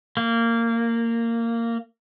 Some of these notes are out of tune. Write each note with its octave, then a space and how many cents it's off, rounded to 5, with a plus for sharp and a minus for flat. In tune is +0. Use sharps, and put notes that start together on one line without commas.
A#3 -15